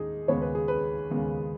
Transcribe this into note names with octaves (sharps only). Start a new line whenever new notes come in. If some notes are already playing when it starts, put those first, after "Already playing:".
Already playing: D#2 G#3 D#4 G#4
D#2 C#3 G#3 B3 C#5
B4
G#4
B4
D#2 C#3 G#3 B3